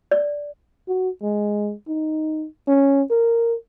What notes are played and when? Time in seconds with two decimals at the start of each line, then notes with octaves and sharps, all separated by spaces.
0.11 D5
0.88 F#4
1.22 G#3
1.88 D#4
2.68 C#4
3.11 A#4